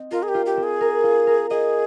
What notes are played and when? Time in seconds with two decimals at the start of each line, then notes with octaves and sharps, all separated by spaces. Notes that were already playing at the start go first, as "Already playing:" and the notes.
Already playing: C4 D#5
0.11 F4 A#4
0.23 G#4
0.28 G4
0.34 F4
0.46 G4
0.57 C4
0.63 G#4
0.81 A#4
1.04 F4
1.27 A#4
1.50 G#4 D#5